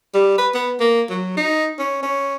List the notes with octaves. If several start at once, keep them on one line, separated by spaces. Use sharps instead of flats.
G3
B4
B3
A#3
F#3
D#4
C#4
C#4